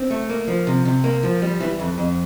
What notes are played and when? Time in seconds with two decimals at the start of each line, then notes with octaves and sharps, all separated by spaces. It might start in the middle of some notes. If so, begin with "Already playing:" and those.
Already playing: C4
0.10 A3
0.29 A#3
0.48 F3
0.67 C3
0.85 C3
1.04 A#3
1.23 F3
1.42 G3
1.60 E3
1.80 F2
1.98 F2